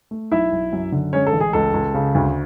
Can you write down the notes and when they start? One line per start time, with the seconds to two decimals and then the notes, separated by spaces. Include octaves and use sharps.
0.11 A3
0.32 B1 E4 E5
0.52 B1
0.73 F#2
0.92 D3
1.13 G#3 C#4 C#5
1.27 A4
1.33 A1
1.40 G#4
1.53 C#2 A4
1.74 C#2
1.94 C#3
2.15 D2